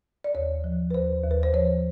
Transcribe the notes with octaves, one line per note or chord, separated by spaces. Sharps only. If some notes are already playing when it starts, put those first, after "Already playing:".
D5
D#2 C#5
F3
B4
D#2 C5
D#2
B4
C5
F3 C#5